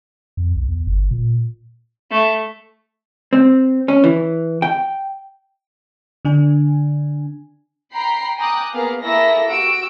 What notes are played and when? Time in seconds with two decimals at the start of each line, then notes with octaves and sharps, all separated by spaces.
0.37 F2
0.56 B1
0.69 E2
0.87 G1
1.11 A#2
2.11 A3
3.33 C4
3.88 C#4
4.04 E3
4.62 G5
6.25 D3 D4 G#5
7.93 G5 A#5 B5 C7
8.37 G5 G#5 A#5 D6 D#6 F#6
8.73 A#3 B3 G#4 F5
9.03 A#3 E4 G#4 A4 E6 A#6
9.49 F#4 G4 E6 D7